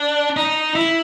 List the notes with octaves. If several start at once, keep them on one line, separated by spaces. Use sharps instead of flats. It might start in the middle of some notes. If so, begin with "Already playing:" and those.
Already playing: D4
D#4
E4